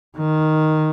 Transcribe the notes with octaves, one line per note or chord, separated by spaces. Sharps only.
D#3